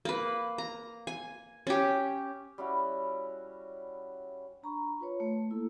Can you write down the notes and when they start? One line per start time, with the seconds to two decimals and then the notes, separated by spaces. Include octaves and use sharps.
0.05 A#3 B4
0.58 A#5
1.07 G#5
1.67 C#4 G4
2.58 G3 C#4 E4 F#4
4.63 D4 A#5 B5 C#6
5.00 F4 B4 C#5
5.20 A3
5.50 A#3 E4 A4